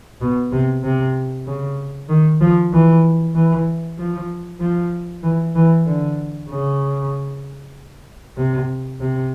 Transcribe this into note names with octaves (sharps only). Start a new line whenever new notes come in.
B2
C3
C3
C#3
D#3
F3
E3
E3
F3
F3
E3
E3
D3
C#3
C3
C3